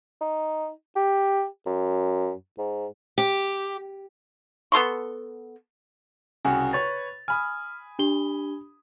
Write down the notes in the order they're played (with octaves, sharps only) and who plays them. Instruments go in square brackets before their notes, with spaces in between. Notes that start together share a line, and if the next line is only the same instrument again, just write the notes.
[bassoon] D#4
G4
F#2
G#2
[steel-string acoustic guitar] G4
[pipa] B3 A4 C6 C#6
[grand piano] C2 C#3 F#4 [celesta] G#5
[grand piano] B4 C#5 C#6 [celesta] A6
[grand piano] G#5 B5 D#6 [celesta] F6
[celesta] D4 G4 G7